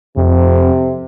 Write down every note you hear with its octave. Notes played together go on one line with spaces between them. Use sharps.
F2 C3